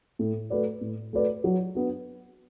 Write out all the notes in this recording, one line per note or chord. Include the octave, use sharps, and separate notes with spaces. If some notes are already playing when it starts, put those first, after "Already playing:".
A2
A3 F#4 B4 D5
A2
A3 F#4 B4 D5
F#3
B3 D4 F#4